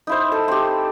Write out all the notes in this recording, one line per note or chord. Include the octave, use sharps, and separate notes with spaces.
D#4 E4 C5
A4
C4 G4